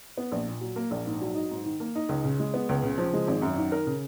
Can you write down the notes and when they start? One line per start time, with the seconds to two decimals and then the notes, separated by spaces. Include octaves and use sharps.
0.17 B3
0.32 A#1
0.47 A#2
0.61 F#3
0.76 A#3
0.91 A#1
1.06 G#2
1.21 F#3
1.35 D#4
1.51 G#2
1.66 D#3
1.80 A#3
1.95 D#4
2.09 C#2
2.24 C#3
2.40 G#3
2.54 B3
2.69 C#2
2.83 C#3
2.98 F3
3.14 G#3
3.28 G#1
3.42 F#2
3.57 D#3
3.72 A#4
3.87 C#3